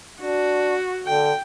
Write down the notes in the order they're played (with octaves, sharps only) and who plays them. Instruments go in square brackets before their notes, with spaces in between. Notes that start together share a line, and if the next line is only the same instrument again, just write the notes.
[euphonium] D4 [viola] F#4
[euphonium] D3 [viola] G5